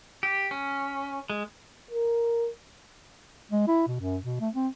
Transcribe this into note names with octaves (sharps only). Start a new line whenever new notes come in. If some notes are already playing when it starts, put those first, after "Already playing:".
G4
C#4
G#3
A#4
G#3
E4
B2
F#2
B2
A3
C4